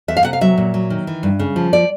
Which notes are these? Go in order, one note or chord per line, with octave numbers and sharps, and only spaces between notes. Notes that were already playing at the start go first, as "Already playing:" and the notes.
E2 E5
F5
C3 F#5
F5
F#3 E5
A#2
F#3
D#3
E3
G2
C#3
F3
D5